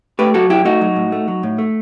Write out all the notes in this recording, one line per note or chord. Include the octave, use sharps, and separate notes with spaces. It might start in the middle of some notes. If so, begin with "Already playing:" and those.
A3 G4 B4
F#3 F#4 A4
F#2 E4 G4
A3 D#4 F#4
F#3
A2
A3
F#3
A2
A3